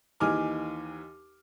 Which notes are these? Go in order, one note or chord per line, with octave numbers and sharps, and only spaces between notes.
D#2 E3 D#4 G#5 D6 F6